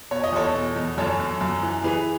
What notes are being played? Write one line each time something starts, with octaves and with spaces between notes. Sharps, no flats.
B2 C#5
D#5
E2 A4 C#5
B2
E2
F#2 A4 C#5
F#2
F#2
E3
E3 G#4 B4